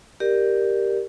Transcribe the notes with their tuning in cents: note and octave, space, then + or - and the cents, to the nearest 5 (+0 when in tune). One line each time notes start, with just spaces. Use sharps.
G4 +0 A#4 +0 D5 +20